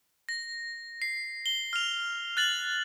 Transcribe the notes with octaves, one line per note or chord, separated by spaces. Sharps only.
A#6
C7
G7
F6 F7
F#6 A6 F#7